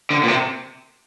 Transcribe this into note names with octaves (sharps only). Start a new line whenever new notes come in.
D3
A#2
C3